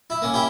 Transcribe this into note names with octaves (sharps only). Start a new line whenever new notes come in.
E4
A#3 C#4
E4 G4